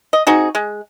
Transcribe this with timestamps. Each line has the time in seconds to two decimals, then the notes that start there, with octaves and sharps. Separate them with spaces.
0.13 D#5
0.27 C4 D#4 F#4 G#4
0.55 G#3